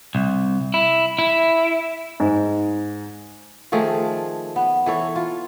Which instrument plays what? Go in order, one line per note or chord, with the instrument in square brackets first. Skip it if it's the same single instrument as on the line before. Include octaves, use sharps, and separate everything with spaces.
[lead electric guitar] C2
E4
E4
[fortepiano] G#2
[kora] D#3 F3 A3 G#4
B3
E3 A4 C#5
F4